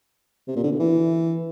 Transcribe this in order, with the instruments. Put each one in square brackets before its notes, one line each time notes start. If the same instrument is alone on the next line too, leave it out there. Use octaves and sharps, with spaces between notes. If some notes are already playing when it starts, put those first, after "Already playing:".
[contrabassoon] C3
A#2
D3
B2
E3